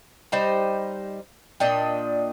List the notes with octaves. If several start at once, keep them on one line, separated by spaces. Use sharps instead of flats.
G3 D#4 C5 G5
A#2 D4 D#5 G5